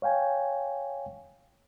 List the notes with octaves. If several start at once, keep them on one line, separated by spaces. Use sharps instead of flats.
C#5 F5 G5 G#5